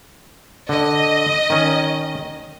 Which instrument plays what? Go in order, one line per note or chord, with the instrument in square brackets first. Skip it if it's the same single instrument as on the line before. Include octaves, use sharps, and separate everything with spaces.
[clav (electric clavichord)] D3 [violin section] D#5
[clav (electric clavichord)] D#3 C#4